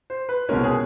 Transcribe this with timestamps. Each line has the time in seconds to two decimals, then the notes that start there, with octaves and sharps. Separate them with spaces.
0.10 C5
0.29 B4
0.49 C2 B2 G#3 C#4 A#4
0.64 G#4